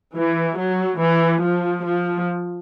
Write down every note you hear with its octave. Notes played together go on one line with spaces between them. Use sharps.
E3
F#3
E3
F3
F3